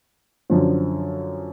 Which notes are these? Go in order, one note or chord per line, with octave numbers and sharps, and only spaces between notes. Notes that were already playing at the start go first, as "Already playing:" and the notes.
F#2 D3 F3